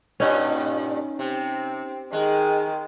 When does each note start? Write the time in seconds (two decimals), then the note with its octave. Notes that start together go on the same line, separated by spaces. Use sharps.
0.20 G2 A#2 C#4 D#4
1.19 C3 C4
2.13 D#3 G#3 G#4